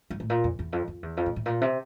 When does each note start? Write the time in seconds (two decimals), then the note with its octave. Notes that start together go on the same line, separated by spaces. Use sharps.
0.10 G2
0.20 A2
0.30 A#2
0.44 F2
0.59 E2
0.73 F2
0.88 F2
1.03 E2
1.17 F2
1.26 A2
1.36 A2
1.46 A#2
1.61 C3